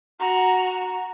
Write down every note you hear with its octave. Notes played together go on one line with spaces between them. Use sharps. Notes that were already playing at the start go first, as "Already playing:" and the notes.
F#4 A#5